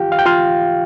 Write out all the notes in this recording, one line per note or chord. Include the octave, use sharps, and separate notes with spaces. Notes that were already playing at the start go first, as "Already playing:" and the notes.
Already playing: F4 G4 F5 G5
F5
G5
F4 F5